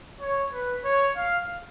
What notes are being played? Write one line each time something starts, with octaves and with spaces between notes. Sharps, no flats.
C#5
B4
C#5
F5